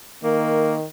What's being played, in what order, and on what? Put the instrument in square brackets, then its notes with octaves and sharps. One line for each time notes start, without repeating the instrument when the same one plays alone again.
[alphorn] D#3 [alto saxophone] A#3